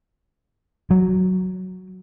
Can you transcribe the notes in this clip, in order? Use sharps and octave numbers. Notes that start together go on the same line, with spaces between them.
F#3